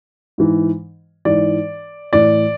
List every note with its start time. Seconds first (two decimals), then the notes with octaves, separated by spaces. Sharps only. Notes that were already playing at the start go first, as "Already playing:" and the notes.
0.38 G#2 E3
1.25 G#2 E3 D5
2.13 A2 E3 D5